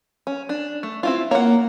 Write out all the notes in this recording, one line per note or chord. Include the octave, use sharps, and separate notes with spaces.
C#4
D4
A3
C4 E4 F4
A#3 C#5 F#5